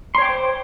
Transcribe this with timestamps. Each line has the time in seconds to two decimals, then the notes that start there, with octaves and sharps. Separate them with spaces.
0.15 C6
0.18 C#5
0.22 G5
0.25 D6
0.29 C5